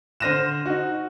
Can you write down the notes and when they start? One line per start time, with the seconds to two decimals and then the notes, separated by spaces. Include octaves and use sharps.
0.20 D3 C5 F6 A#6 D#7 E7
0.66 D#4 F#4